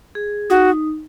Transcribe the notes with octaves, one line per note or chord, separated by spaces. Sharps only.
G#4
D#4 F#4